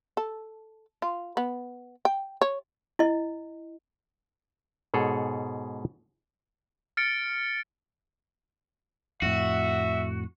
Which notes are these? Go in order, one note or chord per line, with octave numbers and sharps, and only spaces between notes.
A4
F4
B3
G5
C#5
E4 D#5
G#2 B2 G#4 A4 C#5
F6 A6 C#7 D7
F2 A2 F#4 E5